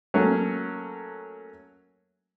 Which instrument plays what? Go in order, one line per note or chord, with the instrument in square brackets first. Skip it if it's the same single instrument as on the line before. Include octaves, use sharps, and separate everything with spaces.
[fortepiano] F#3 A3 A#3 C#4